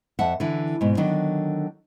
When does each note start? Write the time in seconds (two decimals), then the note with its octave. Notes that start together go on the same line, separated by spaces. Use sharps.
0.19 F2 E5 F#5 A5
0.40 D3 E3 E4
0.81 G#2 B2
0.97 D3 D#3 F#3 D4